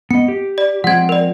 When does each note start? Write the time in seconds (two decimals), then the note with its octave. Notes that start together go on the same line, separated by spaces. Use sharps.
0.11 B3 D#5 C#7
0.28 G4
0.58 D5
0.84 F3 G#3 C4 F#5 G#6
1.09 A#4 D5